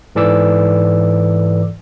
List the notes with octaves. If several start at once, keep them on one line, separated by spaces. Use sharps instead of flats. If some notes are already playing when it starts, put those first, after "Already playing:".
G#2 E3 A4 D5 D6 E6